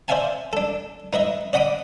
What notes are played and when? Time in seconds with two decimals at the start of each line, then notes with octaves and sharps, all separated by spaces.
0.08 C5 D5 E5 F5 G#5 A5
0.53 D4 A4
1.13 D#4 B4 D#5 E5
1.53 D5 D#5 F#5 B5 D6 D#6